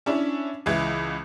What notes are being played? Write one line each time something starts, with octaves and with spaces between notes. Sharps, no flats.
C#4 D4 E4
C#2 E3